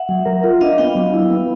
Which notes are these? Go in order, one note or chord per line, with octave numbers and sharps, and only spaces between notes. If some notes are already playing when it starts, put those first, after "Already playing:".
Already playing: E5 F#5
F#3
A#4
F4
D4 D#5 F5
B3 F5 G5
F#3
E4
B3